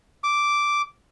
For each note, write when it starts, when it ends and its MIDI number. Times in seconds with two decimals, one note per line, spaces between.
0.24 0.82 86